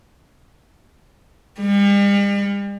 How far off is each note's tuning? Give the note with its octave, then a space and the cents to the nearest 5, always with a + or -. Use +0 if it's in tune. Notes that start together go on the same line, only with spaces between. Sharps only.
G3 +45